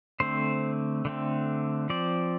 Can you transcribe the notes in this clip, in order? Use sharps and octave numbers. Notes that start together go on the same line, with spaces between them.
D3 A3 C4 C5
D3 A3 C4
F3 C4 D5